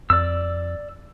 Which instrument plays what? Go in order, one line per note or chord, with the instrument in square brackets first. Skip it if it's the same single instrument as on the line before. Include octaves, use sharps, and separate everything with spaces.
[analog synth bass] F2 [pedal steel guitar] D5 E6